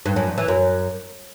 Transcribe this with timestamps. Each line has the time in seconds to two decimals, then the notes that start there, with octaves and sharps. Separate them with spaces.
0.06 G2
0.16 F#2
0.27 E2
0.38 E3
0.48 F#2